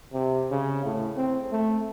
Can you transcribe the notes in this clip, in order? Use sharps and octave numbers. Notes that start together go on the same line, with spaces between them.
C3
C#3
A2
C4
A3